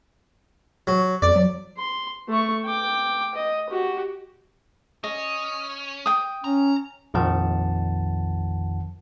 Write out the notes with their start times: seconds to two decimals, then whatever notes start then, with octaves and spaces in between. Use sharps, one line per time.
0.87 F#3
1.22 F2 D5
1.36 F#3
1.77 C6
2.28 A3 C#6
2.65 G5 D6
3.35 D#5
3.69 F#4 G4
5.04 C#4 D#5
6.06 G5 D#6
6.44 C#4 A#5
7.14 A#1 F2 D#3 F3 F#5 A5